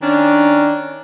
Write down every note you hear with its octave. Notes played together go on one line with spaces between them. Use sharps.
D#3 C#4 D4